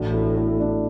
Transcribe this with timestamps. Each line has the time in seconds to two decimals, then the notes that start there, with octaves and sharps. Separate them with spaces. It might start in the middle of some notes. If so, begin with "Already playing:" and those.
Already playing: A1 A2 A3 D4 F#4
0.13 E4 A4
0.37 E4 A4
0.60 D4